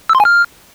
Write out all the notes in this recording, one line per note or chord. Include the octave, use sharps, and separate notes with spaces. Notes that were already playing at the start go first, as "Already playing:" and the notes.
E6
C6
G#5
F6